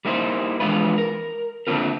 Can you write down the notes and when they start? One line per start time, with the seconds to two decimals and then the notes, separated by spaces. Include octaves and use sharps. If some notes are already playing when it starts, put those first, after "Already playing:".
0.05 G3 A#3 D#4 E4 C5
0.60 E3 F3 G#3 D4 F4 B4
0.98 A#4
1.67 D3 A3 A#3 C4 F4 A#4